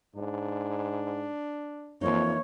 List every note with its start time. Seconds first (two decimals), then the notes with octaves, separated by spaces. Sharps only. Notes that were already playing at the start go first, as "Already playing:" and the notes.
0.16 G#2 D4
2.01 F2 E3 A#3 D#4 C#5